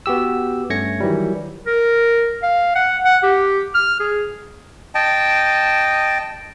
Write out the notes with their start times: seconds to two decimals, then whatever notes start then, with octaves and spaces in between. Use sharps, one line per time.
0.06 B3 F#4 G4 E6
0.70 G2 A3 C#4 G#6 A#6 C#7
1.00 D#3 E3 F#3 G3
1.67 A#4
2.43 F5
2.75 F#5
3.05 F#5
3.23 G4
3.75 F6
4.00 G#4
4.95 D#5 G5 A5